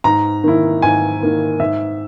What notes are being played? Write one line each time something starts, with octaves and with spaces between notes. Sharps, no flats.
G#2 A#5
D#3 A#3 E4
G#2 G#5
D#3 A#3 E4
G#2 E5